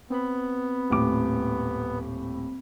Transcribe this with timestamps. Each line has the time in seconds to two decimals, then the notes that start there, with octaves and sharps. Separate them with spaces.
0.10 B3 C4 B5
0.90 D#1 A2 D6